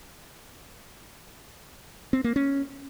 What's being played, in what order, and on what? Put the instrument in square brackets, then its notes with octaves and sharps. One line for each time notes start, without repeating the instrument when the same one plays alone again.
[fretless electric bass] C4
A#3
C#4